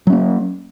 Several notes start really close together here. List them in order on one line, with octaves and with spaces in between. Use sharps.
F#3 C#4 A#3